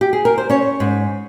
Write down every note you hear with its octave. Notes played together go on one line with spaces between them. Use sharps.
G4
G#4
A#4
C5
C#4 C#5
G#2